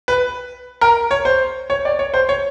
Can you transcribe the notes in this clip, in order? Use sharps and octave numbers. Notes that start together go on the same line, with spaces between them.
B4
A#4
C#5
C5
C#5
D5
C#5
C5
C#5